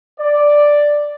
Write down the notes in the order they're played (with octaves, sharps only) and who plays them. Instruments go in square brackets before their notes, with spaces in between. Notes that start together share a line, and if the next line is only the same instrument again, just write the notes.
[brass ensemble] D5